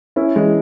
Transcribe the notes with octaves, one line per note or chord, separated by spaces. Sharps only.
C#4 E4
E3 G#3